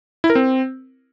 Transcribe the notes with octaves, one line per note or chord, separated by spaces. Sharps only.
E4
A#4
C4